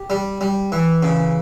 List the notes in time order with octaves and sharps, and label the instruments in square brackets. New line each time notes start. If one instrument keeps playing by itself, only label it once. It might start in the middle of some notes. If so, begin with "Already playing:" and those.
Already playing: [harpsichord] G4
G3
G3
E3
C#3